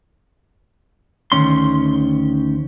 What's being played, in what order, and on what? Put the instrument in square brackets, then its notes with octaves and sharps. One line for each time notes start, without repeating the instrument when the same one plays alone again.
[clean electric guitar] D2 D#3 C#4 C6